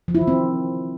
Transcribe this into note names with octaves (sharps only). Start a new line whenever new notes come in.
F3
E4
D#3
C4